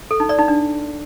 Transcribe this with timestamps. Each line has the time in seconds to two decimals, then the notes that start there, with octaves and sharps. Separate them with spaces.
0.11 A4
0.20 D#4
0.29 D5
0.39 D#4
0.48 D4